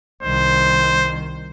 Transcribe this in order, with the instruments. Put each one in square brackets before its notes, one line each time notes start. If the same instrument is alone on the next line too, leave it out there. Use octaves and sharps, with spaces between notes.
[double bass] C2 D#3 [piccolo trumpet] C5